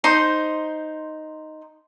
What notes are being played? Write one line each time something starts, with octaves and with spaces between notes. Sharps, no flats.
D#4 C5 C6